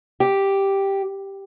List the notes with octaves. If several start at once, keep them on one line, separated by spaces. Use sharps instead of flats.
G4